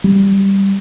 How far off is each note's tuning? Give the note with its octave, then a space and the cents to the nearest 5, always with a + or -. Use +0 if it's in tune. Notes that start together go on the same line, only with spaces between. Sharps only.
G3 +0